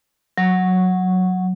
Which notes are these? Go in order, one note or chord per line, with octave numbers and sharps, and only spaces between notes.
F#3